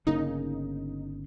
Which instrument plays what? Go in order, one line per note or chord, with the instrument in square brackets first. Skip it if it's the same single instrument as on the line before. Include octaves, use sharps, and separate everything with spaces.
[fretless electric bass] G1 C#3 A#3 [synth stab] D#4